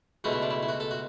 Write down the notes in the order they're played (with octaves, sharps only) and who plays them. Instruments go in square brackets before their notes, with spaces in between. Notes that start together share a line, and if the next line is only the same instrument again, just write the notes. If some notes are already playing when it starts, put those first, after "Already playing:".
[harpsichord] C#2 B2 A3 F#4
E4
D4
E4
E4
F#4
A4
F#4